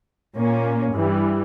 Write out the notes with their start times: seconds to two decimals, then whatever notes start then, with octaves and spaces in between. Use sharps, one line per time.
0.37 A#2 A#3 C#4
0.95 G2 E3 G3